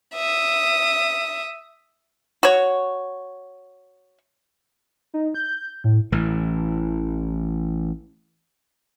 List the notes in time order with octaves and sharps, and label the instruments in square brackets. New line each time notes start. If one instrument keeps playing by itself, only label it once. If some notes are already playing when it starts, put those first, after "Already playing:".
[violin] E5 D#6
[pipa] F#4 C#5
[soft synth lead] D#4
G6
A2
[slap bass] A1 A2 E3